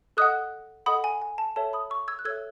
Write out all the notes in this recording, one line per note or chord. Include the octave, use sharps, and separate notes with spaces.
A4 D#5 F#5 D#6 F#6
A4 D#5 F#5 B5 D#6
G#5
G#5
A5
A4 C#5 E5 A5
B5 D#6
C#6 E6
E6 G#6
F#6
A4 C#5 E5 E6 G#6